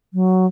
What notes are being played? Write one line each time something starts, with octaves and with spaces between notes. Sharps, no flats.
F#3